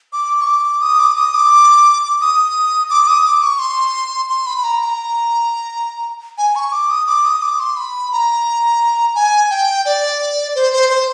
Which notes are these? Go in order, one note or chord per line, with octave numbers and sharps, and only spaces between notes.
D6
C#6
D6
D#6
D6
D#6
D6
D#6
D6
D#6
D6
C#6
C6
C6
B5
B5
A#5
A#5
G#5
C#6
D6
D#6
D6
D#6
D6
C6
B5
A#5
G#5
G5
D5
C5
C5
C5